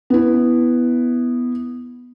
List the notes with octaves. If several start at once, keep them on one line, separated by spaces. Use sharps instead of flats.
B3 E4